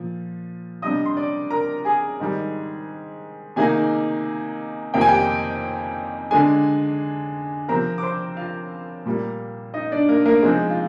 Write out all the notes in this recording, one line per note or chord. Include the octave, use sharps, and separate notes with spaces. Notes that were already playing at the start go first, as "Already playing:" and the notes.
Already playing: A#2 F3
C3 G3 D4 D#5 D#6
C6
D5 D6
A#4 A#5
G#4 G#5
G#2 D#3 G3
C3 D#3 A#3 D#4 G#4 G#5
F2 C3 D#3 A#3 D#4 G5
G#5
G4 G5
D3 G#3 D4 G#4 G#5
C3 F3 C4 A#4 A#5
D6
C5 C6
F4 F5
A#2 G3 A#3
D#4 D#5
D4 D5
A#3 A#4
A#3 A#4
C3 F3 G#3 C4 D#4 G#4
F4